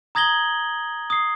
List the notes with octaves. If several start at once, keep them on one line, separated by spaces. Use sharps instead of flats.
A#5 D#6 G#6 A#6 F#7 G7
D#6 C7